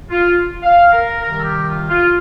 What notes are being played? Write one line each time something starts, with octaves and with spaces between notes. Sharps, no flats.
F4
F5
A#4
C3 D#3 G3 A#4
A4
G4
F4
F4